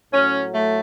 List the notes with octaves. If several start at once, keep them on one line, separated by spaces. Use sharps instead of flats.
A2 F#3 C#4
A3